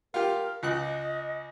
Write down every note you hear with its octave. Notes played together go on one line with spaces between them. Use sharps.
F4 G4 A#4
C#2 D#5 F#6